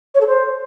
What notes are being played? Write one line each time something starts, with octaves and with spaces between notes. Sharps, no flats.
C#5
A4
C5